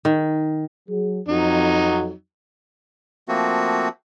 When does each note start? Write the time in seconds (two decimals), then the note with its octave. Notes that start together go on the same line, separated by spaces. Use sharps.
0.05 D#3
0.89 F#3 G#4
1.28 F2 F#3 D#4
3.28 F3 A3 A#3 C4 F#4